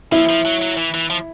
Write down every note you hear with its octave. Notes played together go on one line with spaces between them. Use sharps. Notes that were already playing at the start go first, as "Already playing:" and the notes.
F3 E4
F3
F#3
F#3
E3
E3
F3